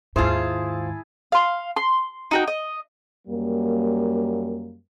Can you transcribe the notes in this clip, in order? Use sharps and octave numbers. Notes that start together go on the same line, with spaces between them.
D#2 G#2 E4 F4 G#4 C5 A5
F5 C6
C6
D#4 F#4 G5
D#5
F#2 G3 A#3